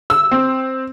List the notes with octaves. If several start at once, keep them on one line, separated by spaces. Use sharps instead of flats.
E6
C4